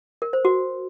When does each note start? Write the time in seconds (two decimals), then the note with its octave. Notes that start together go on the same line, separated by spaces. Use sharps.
0.22 A#4
0.33 C5
0.45 F#4